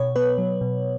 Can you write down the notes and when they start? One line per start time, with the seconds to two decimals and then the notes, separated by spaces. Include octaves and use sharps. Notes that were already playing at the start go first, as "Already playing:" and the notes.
Already playing: B2 C#5
0.16 B3 B4
0.38 F#3
0.61 B2